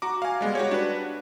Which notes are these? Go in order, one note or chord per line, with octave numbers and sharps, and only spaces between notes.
F#4 A#5 D6
F5 G#5
G3 G#3 B3
F#4 G4 C#5
D4 B4